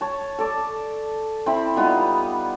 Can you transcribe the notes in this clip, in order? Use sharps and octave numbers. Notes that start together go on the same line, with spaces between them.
C#5 A5
A4 D5
C4 E4 B5
G3 B3 D#4 F4